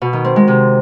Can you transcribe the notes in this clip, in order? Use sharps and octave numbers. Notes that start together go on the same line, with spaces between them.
B2
D#3
C4
G#3
C3